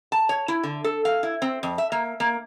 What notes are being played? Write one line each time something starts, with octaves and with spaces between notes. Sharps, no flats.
A5
C#5
E4
D3
A4
F5
E4
C4
F2
E5
A#3
A#3